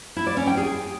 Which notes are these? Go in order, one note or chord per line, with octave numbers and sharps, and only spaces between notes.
E4
D5
C#4
G5
G#4